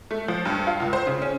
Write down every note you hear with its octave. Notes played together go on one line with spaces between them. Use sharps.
A3
F3
G2
F4
C#2
C5
C#3
C#4